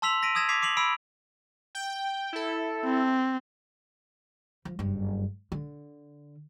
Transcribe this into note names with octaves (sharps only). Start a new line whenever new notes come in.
A5 C6 E6 B6 F7 F#7
A#6 B6 D7 D#7
D#6 E6 G#6 A#6 E7
D6 G#6 B6 C7 F7
D6 C7 F7 F#7
B5 E6 C7 D7
G5
E4 A4
C4
F3
F#1 G2
D3